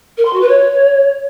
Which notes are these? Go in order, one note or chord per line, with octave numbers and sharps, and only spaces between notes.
A#4
C6
F#4
B4
C#5